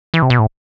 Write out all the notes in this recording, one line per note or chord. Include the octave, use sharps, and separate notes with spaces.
E3
C3
B2
A2